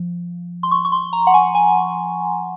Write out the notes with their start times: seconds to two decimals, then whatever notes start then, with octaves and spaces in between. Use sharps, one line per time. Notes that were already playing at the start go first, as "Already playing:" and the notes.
Already playing: F3
0.63 C6
0.71 C#6
0.85 C#6
0.92 C6
1.13 A#5
1.27 F#5
1.34 G#5
1.55 G#5